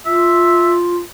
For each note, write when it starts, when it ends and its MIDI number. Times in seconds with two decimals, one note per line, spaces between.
0.06 0.98 65
0.06 0.73 76